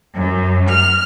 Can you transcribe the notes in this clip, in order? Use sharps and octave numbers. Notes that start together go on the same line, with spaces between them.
F#2
F6